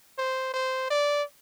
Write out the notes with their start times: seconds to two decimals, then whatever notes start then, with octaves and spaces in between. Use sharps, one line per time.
0.18 C5
0.54 C5
0.90 D5